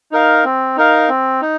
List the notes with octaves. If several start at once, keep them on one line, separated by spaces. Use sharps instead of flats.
D#4 A#4 F5
C4
D#4 A#4 F5
C4
D#4